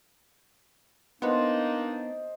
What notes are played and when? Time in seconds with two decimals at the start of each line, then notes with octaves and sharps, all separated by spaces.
1.22 A#3 B3 D4 D#4 C5 D#5